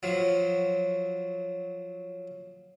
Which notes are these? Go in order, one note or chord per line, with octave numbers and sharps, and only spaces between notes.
F3 F#3